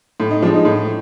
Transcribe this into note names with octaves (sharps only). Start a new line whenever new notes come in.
A2
D#4
F3 G#3 D4
D#4
A2